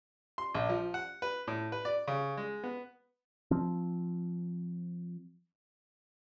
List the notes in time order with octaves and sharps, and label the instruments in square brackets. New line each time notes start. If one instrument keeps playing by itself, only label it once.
[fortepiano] C6
A#1
F3
F#5
B4
A2
B4
D5
C#3
G#3
B3
[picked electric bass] F3 C4